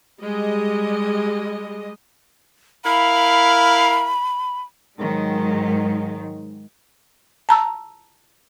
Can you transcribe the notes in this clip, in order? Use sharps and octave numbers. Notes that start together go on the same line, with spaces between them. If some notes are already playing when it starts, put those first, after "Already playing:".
G3 G#3 D#5
E4 A#4 F5 B5
G#2 D#3 F#3 G#3
A5 A#5 E6